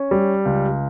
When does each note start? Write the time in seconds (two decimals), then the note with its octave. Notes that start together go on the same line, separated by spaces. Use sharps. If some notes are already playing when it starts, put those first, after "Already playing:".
Already playing: C#4
0.11 G3
0.45 C#2